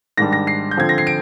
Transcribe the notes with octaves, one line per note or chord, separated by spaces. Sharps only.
G#2 D#3 G3 D4 A#6
A#6
C7
G6
D3 F3 C4 G#6
A#6
C7
D7